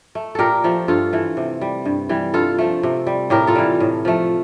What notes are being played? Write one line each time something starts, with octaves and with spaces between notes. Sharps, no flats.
A3
A#2 G4 A4 A#4
F3 A3
G2 F4 A4
E3 A3
C3
G3
G2
E3 G3
G2 F4 A4
F3 A3
C3
G3
A2 G4 A#4
F4 A4
E3 G3
A2
F3 A3